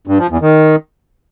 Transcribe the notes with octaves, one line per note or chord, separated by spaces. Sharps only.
G2
F3
E2
D#3